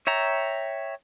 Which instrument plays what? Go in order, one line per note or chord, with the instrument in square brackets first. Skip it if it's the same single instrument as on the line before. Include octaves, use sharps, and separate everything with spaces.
[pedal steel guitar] C#5 E5 G5 A#5